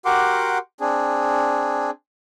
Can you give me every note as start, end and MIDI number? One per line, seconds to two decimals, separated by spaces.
0.05 0.58 66
0.05 0.58 67
0.05 0.58 70
0.05 0.58 78
0.05 0.58 84
0.05 0.58 86
0.80 1.91 60
0.80 1.91 62
0.80 1.91 68